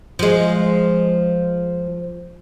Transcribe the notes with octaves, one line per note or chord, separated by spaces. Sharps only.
F3 G#3